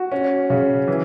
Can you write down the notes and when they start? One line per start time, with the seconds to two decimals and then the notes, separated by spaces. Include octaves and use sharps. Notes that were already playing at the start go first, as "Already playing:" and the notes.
Already playing: F#4
0.12 C#4
0.50 C#3
0.87 E3